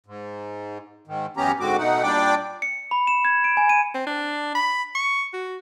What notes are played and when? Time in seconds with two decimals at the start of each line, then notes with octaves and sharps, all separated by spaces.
0.06 G#2
1.08 G#2 D#3
1.37 F#2 E3 B3 C#4 G4 A#5
1.60 G#2 D3 G#3 C4 F#4 D6
1.78 B2 A3 D#4 F#5
2.03 A#2 G3 D4 D5 G5 D6
2.62 C#7
2.91 B5
3.07 E7
3.25 G#6
3.44 D7
3.57 G#5
3.69 D#7
3.94 C4
4.07 D4
4.55 B5
4.95 C#6
5.33 F#4